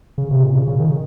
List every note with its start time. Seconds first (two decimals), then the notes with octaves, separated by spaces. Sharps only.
0.18 C#3
0.31 C3
0.43 A#2
0.56 C#3
0.68 C#3
0.80 D#3